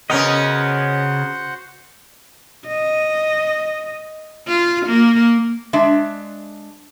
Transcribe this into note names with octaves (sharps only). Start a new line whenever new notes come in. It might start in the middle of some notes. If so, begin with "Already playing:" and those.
C#3 B3 C#4 F#4 A#4 C5 D#5 F#5
D#5
F4
A#3
G#3 D4 E5